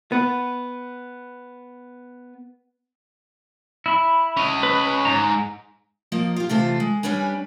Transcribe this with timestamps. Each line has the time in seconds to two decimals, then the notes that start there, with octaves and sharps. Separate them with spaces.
0.12 B3 B4
3.86 E4 B5
4.37 C#4 D#5
4.63 B4
4.80 B4
5.05 G#2 A#5
6.12 F3 A#3 D#5
6.36 F4 G4
6.49 C3 E3 A3 F4 A4 C5
6.80 G#3
7.03 G3 C#4 D4 B4 G#5